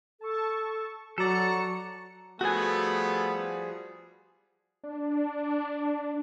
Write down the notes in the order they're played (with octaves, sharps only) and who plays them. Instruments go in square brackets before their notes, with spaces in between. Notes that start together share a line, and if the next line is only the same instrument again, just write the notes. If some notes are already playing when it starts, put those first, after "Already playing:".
[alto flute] A4 [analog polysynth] A5 C#6
[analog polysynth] F#3 C#7 [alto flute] F#4 [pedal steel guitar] A4 D5 [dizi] A#5
[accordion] F3 G3 G#4 [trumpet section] A3 B3 [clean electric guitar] F#4 G#5
[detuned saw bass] D4